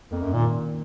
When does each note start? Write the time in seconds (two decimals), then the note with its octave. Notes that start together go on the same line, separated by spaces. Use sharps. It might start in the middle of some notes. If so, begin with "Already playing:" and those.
0.11 F2 A#3
0.22 F#2
0.33 A#2 D#3